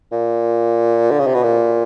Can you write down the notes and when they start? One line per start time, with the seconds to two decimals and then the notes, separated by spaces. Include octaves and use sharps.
0.12 A#2
1.11 D3
1.19 C#3
1.27 C3
1.34 B2
1.43 A#2